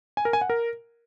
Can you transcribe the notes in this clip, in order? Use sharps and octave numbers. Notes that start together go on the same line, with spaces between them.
G#5
A#4
G#5
F#5
A#4